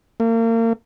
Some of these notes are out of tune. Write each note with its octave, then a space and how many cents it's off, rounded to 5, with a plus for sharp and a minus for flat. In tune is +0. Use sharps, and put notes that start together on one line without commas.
A#3 -35